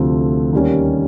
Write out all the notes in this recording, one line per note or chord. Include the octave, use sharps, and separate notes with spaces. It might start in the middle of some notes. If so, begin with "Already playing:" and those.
Already playing: D2 C3 F3 A3 C4
D#2 D#3 G3 A#3 C#4